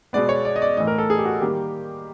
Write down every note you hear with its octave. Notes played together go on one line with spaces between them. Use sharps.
B2 G#3 B3 D5
C#5
D5
D#5
D5
A2 E3 A3 D#5
A#4
A4
G#4
G4
F#4
D#3 G3 A#3 G4